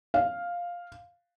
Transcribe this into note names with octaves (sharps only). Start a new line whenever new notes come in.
F5